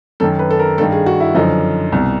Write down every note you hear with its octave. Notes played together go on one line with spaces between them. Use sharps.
F#2 D#3 A4
B4
A4
A#4
G2 D#3 A4
G#4
F#4
E4
F#2 D3 F3 D#4
C2 B2